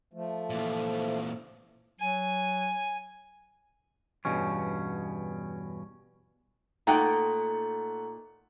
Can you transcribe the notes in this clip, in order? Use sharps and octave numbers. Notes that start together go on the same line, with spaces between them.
F3 A3
A#2 E3
F#3 G#5
E2 G2 B2 C#4
A#2 A3 D#4 F#5 G5 A#5